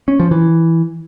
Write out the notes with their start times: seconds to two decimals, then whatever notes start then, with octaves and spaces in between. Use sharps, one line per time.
0.08 C#4
0.20 F3
0.31 E3